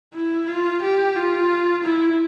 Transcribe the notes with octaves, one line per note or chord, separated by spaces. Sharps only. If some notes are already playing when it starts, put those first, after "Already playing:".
E4
F4
G4
F4
E4